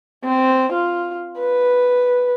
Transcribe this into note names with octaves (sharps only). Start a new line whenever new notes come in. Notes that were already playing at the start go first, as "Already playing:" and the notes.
C4
F4
B4